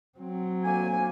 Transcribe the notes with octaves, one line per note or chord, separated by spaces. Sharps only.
F#3 C4
D2 A#3 G#5